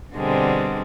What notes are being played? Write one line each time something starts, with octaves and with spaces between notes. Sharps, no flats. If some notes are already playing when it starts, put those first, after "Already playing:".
B2 D3 G3 G#3 C4